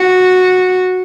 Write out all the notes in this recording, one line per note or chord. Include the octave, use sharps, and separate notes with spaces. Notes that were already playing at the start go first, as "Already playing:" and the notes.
Already playing: F#4